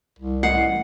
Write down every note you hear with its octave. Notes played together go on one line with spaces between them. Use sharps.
C2
A1 D#5 F#5 C7